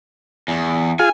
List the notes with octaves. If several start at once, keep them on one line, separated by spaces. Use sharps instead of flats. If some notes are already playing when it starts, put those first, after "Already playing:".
E2
F4 G#4 G#5